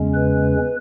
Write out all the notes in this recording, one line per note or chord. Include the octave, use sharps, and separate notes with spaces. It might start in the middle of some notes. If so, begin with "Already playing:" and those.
Already playing: E2 C#3 G#3 C#4
B4